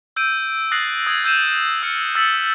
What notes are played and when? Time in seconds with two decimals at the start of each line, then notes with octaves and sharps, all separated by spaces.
0.16 E6 G6 D7 D#7
0.71 D#6 F#6 A6 A#6 C7 F#7
1.07 D#6 G#6 A6 F#7
1.24 E6 G6 D#7 E7
1.82 E6 F6 C#7
2.15 E6 F6 A6 B6 C#7 F#7